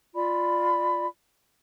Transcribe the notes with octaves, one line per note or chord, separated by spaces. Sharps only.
F4 D5 B5